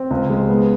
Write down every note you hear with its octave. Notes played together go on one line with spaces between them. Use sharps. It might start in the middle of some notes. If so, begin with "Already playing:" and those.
Already playing: C4
C#2
G#3
B3